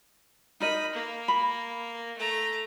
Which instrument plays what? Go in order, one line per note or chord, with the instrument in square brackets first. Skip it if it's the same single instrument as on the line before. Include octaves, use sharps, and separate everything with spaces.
[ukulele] D#4 A#4 D#5 [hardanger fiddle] B5
[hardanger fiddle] A#3
[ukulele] B5
[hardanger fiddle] A3 A#5